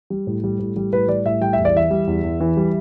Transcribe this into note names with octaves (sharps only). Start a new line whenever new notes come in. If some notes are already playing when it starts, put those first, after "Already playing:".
G3
A2
G3
A2
G3
A2 B4
G3 D5
A2 E5
G3 G5
E5
E2
D5
E3 E5
G3
E2
E2
E3
G3